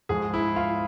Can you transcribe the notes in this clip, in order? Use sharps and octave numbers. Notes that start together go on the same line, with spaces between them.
G#2 F3 G#3 G#4
E4
F4